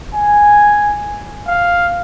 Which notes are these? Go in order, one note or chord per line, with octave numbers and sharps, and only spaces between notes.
G#5
F5